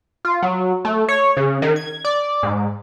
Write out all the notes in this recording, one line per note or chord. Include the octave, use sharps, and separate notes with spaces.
F4
F#3
A3
C#5
C#3
D#3
G#6
D5
G#2